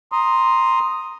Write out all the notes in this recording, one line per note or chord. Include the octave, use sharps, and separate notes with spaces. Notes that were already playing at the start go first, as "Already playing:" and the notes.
A#5 C6 D#6